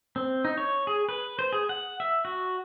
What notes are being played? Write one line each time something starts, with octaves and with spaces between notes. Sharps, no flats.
C4
D#4
C#5
G#4
B4
C5
G#4
F#5
E5
F#4